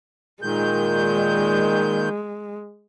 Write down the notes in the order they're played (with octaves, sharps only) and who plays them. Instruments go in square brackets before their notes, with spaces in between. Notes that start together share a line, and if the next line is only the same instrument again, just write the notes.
[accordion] A#2 D#3 G6 [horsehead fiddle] G#3